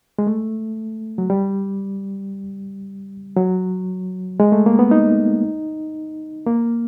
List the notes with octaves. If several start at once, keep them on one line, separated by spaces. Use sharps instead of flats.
G#3
A3
F#3
G3
F#3
G#3
A3
A#3
B3
D#4
A#3